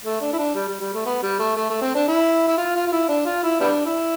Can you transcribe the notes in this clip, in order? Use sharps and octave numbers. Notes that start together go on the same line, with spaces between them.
A3
D4
E4
D4
G3
G3
G3
A3
B3
G3
A3
A3
A3
C4
D4
E4
E4
F4
F4
F4
E4
D4
F4
E4
G3 B3 D4
E4